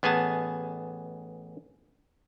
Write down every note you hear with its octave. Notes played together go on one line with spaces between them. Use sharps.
A1 B3 G#4 G#5 A5